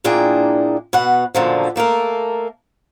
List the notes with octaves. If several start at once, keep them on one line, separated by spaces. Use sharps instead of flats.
A#2 A#3 D4 E4 G#4 G5
B2 B4 F#5
F#2 A#2 D3 D#3 F3
A3 A#3 A4 A#4